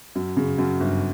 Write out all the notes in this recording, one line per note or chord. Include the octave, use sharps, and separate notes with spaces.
F#2
C#3
F#2
G1